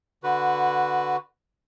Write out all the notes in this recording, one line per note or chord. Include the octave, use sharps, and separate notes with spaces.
D3 F#4 B4